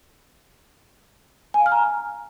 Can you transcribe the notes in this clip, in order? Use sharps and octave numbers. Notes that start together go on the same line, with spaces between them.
G#5
F5
F6
A#5